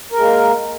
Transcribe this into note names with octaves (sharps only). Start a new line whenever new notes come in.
G#3 A#3 A#4